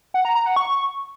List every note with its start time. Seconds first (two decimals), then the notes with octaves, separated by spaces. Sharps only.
0.14 F#5
0.25 A#5
0.35 A#5
0.46 F#5
0.56 C#6